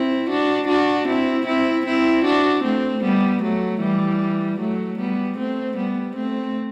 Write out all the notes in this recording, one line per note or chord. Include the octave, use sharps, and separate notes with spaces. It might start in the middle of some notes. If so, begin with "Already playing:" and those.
Already playing: C4 E4
D4 F#4
D4 F#4
C4 E4
C4 E4
C4 E4
D4 F#4
A3 C4
G3 B3
F#3 A3
E3 G3
F#3 A3
G3 B3
A3 C4
G3 B3
A3 C4